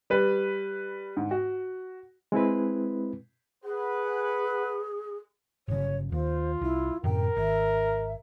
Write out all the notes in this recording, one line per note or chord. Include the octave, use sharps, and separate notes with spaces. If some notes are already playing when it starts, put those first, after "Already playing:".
G3 B4
G#2
F#4
G#3 C4 E4 B4
G#4 B4 F#5
G1 C#3 C#5
D#2 F4 C5
C2 E4
F#2 A2 C3 A#4 G5
G#1 E5